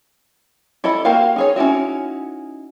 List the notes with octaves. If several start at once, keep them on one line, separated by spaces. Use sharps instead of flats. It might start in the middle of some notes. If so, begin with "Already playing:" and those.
E4 A4 D#5 B5
A#3 F#4 G4 A#4 F5
D#4 G#4 C#5
C#4 D#4 E4 F#4